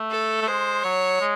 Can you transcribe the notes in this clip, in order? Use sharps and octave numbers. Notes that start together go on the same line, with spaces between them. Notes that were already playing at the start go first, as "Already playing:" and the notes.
Already playing: A3
A4
A3
G#3 C5
F#3 C#5
G#3